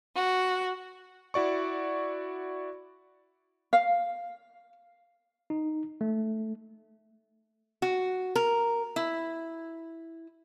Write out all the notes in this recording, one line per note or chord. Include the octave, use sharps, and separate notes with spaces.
F#4
E4 F#4 D5 C#6
F5
D#4
A3
F#4
A#4
E4